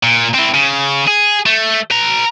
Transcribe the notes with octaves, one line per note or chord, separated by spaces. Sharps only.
A#2
C4 E4
C#3
G#4
A3
B4 A#5